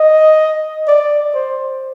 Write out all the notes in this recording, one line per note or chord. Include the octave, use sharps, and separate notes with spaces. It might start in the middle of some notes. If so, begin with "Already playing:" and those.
Already playing: D#5
D5
C5